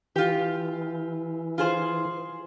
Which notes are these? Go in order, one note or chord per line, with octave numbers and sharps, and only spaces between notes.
E3 F4 G4
F4 G#4 C5